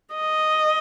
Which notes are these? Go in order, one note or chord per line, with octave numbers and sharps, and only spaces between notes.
D#5